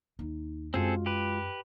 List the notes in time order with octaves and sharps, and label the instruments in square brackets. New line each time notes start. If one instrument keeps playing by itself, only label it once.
[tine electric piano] D#2 [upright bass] D#4
[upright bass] F#2 [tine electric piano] G#3 F4 F#4 [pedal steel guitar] C4 G#4 A4
[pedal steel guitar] G4 B4